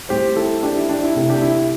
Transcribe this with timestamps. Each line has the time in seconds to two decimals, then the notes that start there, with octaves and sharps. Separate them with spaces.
0.09 A2 G3 C4 G4 C5
0.36 E4 A4
0.63 D4 G4
0.76 E4
0.89 D4 G4
1.03 E4
1.15 C3 A3 C4 E4
1.29 D4 G4
1.42 E4
1.55 E4